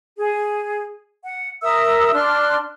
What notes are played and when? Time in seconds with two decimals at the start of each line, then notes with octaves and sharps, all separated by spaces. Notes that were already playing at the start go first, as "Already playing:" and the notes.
0.17 G#4
1.23 F#5
1.62 A#4 E5 D#6 E6
2.14 D4 C6 F6 F#6